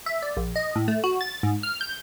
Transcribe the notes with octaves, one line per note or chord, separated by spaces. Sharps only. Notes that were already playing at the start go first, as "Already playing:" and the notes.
E5
D5
A#1
D#5
A2
A3
F#4
A6
G#2
F6
G6